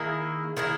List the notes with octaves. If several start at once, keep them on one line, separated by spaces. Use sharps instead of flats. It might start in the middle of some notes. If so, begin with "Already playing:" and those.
Already playing: D#3 A#3 E4 G#4
D#3 A#3 E4 G#4